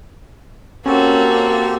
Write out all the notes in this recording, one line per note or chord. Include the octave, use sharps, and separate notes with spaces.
A#3 C4 C#4 F#4 G4 A4